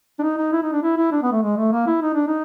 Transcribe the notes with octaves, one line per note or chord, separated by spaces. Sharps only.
D4
D#4
D#4
E4
D#4
D4
E4
E4
D4
B3
A3
G#3
A3
A#3
E4
D#4
D4
D#4